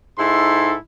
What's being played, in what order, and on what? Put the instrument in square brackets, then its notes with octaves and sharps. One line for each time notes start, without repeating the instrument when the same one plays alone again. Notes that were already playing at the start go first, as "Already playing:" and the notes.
[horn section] G#2 D#4 E4 A4 C6